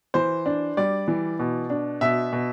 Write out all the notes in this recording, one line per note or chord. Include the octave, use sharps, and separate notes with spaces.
E3 C5
D4
G3 D5
E3
B2
D4
B2 E5
B2